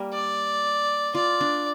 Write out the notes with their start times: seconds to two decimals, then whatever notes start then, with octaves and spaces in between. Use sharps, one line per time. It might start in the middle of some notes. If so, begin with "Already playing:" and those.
Already playing: G3 A#3
0.13 D5
1.15 F4 D5
1.41 D4